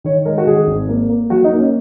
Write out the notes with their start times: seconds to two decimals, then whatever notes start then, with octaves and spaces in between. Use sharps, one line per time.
0.04 D#3 C#5
0.25 G#3 A#4
0.38 F#4
0.47 D#3 G#4
0.67 G#1
0.89 A#3
1.10 A#3
1.30 F#3 F#4
1.44 D#4
1.52 A#3
1.59 C#4